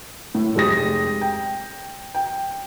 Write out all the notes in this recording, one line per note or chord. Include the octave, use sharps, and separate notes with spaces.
A2
F1 G#3 G4 D#6 A#6
G5
G5